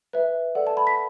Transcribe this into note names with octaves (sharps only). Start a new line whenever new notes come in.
B4 E5
A4 D5 F#5
A5
B5
B6